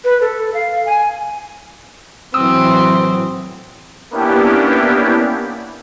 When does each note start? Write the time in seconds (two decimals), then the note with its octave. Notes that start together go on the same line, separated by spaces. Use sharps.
0.04 B4
0.21 A4
0.54 F5
0.86 G#5
2.34 A2 E3 F#3 C4 D#6 E6
4.11 A#3 B3 C#4 D4 E4 G4